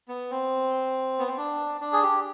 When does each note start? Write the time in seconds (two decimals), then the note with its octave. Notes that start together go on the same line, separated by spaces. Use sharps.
0.08 B3
0.31 C4
1.19 B3
1.27 C4
1.37 D4
1.81 D4
1.93 G#4
2.02 G4